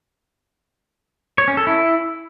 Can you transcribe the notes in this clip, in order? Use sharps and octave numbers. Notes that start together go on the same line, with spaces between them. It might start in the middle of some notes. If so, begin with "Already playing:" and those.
C#5
C#4
A4
E4